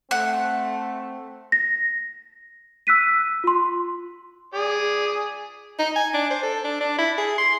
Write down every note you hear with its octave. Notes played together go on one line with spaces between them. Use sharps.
A3 C4 F#5
A#6
E6 F#6 B6 D#7
F4 C6
G#4 D5
D#4
G#5
D4
C5
A4
D4
D4
E4
G#4
C6